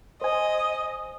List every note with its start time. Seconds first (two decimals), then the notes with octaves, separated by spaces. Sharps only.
0.22 C5 D#5 G#5